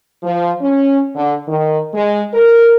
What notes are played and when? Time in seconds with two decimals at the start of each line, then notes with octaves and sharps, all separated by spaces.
0.23 F3
0.62 C#4
1.16 D3
1.48 D#3
1.94 G#3
2.34 A#4